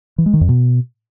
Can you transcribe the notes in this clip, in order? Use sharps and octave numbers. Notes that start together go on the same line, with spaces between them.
E3
G#3
D#3
F2
B2